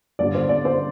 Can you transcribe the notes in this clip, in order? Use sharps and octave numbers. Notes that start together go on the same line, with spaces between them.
G2 D3 D5
C5
D5
C5